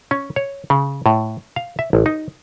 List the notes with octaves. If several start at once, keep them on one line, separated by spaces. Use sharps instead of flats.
C#4
C#5
C#3
A2
F5
E5
A1
D#4